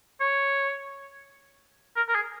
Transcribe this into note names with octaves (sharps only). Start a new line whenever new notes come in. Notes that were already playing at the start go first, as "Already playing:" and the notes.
C#5
A#4
A#4
G#4